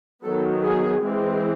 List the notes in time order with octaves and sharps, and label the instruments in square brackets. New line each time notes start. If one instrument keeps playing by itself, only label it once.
[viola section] D#3 F#3 B3 A4
G#4
E3 G#3 C4